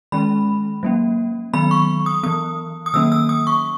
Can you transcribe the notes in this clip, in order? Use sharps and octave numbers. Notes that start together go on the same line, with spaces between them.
D#3 G#3 C#4 B5
F#3 A#3 C#4
D#3 F#3 B3 B5
C#6
D#6
E3 B3 D#6
D#6
D#3 F#3 A#3 C#4 E6
E6
D#6
C#6